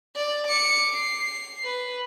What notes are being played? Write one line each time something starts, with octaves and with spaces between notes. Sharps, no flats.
D5
D6 C#7
C7
B4